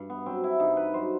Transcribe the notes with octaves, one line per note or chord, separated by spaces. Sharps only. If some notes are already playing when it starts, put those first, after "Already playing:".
Already playing: G2
B3
F#3 C4
E4
G2 D#4
B4
F#3 C5